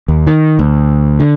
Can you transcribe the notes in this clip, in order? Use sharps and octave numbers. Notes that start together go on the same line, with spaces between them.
D#2
D#3
D2
D3